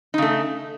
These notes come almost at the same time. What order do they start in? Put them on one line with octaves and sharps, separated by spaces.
D#4 C#3 A3